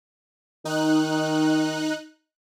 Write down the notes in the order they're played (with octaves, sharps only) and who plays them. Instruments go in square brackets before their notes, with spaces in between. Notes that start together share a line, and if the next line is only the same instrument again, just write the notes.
[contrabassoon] D#3 [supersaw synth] D#4 F#6